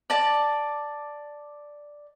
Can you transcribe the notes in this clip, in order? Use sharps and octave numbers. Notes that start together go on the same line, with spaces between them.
D5 A5